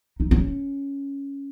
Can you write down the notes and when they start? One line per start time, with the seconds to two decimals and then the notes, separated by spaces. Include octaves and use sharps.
0.20 D#4
0.31 C#4